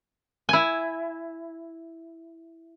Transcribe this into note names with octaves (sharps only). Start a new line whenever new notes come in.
E4 G#5